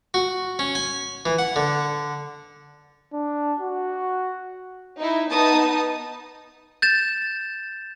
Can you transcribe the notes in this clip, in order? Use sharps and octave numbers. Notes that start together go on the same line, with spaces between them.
F#4
C#4
G#5
E3
F#5
D3
D4
F#4
D#4 E4
B3 D#4 A5 D#6
G6 A6 E7